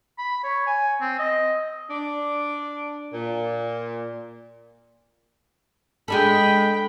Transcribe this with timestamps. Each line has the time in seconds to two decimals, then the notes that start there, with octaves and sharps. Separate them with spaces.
0.18 B5
0.44 C#5
0.67 G#5
1.01 C4
1.19 D#5
1.89 D4
3.11 A#2
6.08 G#3 D4 A4 G5 B5